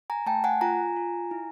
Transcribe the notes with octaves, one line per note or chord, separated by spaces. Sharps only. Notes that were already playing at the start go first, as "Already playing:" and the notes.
G#5 A#5
A3 G5 A5
F#5 G#5
F4 G#5 A#5
F4
E4